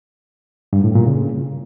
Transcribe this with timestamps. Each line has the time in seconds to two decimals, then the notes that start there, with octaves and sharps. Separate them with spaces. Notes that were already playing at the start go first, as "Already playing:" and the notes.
0.73 G2
0.84 A2
0.95 A#2
1.07 C#3